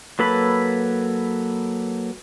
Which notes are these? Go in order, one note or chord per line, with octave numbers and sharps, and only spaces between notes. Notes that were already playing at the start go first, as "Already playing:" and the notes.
F#3 A#3 A4 B4 B5